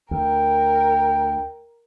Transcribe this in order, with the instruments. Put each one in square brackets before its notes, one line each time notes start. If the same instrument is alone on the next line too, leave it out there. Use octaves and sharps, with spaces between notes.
[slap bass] D2 [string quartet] A#4 [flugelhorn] G5